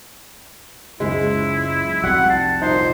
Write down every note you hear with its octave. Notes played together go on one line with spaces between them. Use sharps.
F#1 C#2 G#2 G#3 E4
F1 C2 G3 F#4 F#5
A5 C7
A#2 D#4 C5